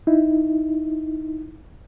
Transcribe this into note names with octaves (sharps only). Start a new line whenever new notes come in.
D#4 E4